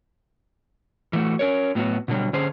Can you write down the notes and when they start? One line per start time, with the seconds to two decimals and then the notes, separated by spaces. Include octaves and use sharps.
1.13 E3 A3 F#4
1.39 C#4 A#4 C#5
1.75 A2 F#3 B3 E4 F#4
2.08 B2 D3 F#3 G3
2.33 D3 C#4 G#4 C5